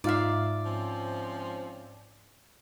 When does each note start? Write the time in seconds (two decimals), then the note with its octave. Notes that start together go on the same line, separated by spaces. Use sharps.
0.04 G#2 D#4 F4 D5 E5 F5
0.65 F3 C4 C#4